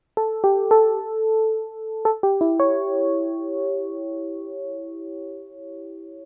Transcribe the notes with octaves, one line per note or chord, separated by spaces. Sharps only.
A4
G4
A4
A4
G4
E4
C#5